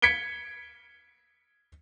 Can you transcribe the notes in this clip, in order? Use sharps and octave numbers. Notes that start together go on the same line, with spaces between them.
G#6 B6 C#7 D7 G7